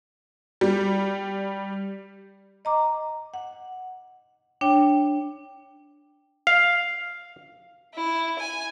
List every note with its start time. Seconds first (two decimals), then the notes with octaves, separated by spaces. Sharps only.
0.61 G3
2.65 D#5 A#5 D6
3.34 F#5
4.61 D4 C#5 G5
6.47 F5
7.95 E4
8.39 G#5